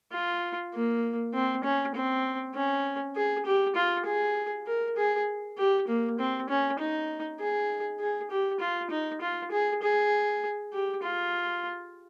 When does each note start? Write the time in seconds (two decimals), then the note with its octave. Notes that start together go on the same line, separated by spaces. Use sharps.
0.12 F4
0.73 A#3
1.34 C4
1.64 C#4
1.95 C4
2.55 C#4
3.16 G#4
3.46 G4
3.76 F4
4.06 G#4
4.67 A#4
4.97 G#4
5.58 G4
5.88 A#3
6.19 C4
6.49 C#4
6.79 D#4
7.40 G#4
8.00 G#4
8.30 G4
8.60 F4
8.90 D#4
9.21 F4
9.51 G#4
9.82 G#4
10.73 G4
11.03 F4